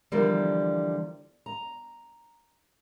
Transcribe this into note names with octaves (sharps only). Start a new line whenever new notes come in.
D3 E3 F3 G3 A#3
A#5